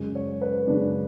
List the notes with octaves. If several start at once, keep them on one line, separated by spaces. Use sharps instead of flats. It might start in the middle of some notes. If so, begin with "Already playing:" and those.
Already playing: F#2 C#3 G#3
C#5
B4
F#2 C#3 G#3 D4